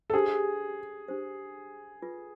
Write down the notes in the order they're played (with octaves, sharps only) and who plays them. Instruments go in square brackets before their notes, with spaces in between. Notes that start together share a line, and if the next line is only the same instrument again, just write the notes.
[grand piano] A4
[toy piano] D4 G4 C5 [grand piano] G#4
[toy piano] D4 G4 C5
F4 G#4 B4